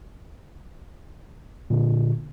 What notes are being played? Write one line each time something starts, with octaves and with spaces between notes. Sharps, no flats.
A#2 D3